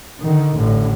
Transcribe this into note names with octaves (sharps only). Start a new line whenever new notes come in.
D3 D#3
A1 A2 D3